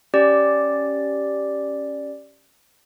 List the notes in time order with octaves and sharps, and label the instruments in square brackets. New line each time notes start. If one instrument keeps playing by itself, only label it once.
[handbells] C#4 G4 D5